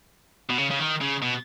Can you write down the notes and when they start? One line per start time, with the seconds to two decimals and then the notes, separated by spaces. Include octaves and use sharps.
0.50 B2
0.58 C#3
0.70 C#3
0.79 D#3
1.01 C#3
1.22 B2